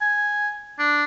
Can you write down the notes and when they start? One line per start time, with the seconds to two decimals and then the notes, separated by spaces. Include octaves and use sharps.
0.01 G#5
0.79 D4